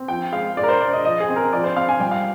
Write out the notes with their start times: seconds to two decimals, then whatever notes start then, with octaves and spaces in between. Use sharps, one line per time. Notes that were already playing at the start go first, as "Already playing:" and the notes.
Already playing: C4
0.08 F3 G5
0.32 G#3 F5
0.57 G#3 D5
0.63 A#4
0.68 C5
0.81 D4 D5
0.93 D#5
1.04 F3 D#5
1.20 G#4
1.29 C4
1.36 A#4
1.53 F3 D5
1.64 C5
1.76 C4 F5
1.89 G#5
2.00 G3 G5
2.11 F5